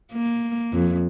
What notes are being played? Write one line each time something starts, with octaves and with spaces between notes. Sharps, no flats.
A#3
F2